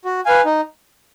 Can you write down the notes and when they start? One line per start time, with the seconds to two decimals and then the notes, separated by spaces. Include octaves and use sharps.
0.05 F#4
0.26 B4 F5 G#5
0.45 D#4